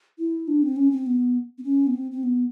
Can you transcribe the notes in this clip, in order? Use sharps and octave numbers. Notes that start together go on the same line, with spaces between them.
E4
D4
C4
C#4
C4
B3
C4
C#4
B3
C4
C4
B3